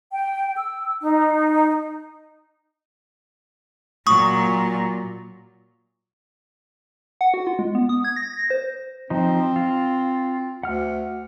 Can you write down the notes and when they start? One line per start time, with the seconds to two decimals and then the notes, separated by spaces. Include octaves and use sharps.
0.12 G5
0.56 E6
1.02 D#4
4.07 A#2 F#3 C#6 D#6
7.21 F#5
7.34 F#4
7.47 F4
7.59 G#3
7.75 B3
7.89 D#6
8.05 G#6
8.16 A#6
8.33 A#6
8.50 C5
9.10 F3 C4 D#4
9.56 F4
10.63 D2 F#5 F6